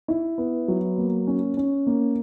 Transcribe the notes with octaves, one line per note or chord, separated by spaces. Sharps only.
E4
B3
F#3
A#3
C#4
C#4
A#3